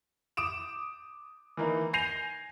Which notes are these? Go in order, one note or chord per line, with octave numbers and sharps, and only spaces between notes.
D6 D#6 D7 E7
E3 A#3 D#4
G#5 G6 A#6 C7 D#7 F7